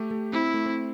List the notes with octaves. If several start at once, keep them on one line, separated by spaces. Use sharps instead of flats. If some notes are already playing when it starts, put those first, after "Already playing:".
Already playing: A3 G4
A3
C4 E4
A3
C4